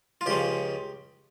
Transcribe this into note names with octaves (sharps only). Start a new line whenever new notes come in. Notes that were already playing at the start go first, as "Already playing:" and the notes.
F4
C#2 C#3 F3 G4